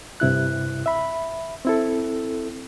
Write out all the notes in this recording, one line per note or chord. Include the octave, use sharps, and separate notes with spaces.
G2 C3 E4 F#6
E5 B5
C4 E4 A4